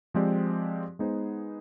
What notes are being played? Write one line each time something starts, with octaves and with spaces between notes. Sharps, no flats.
F3 G#3 C4 G4 D5
G#3 B3 D#4 G#4 C5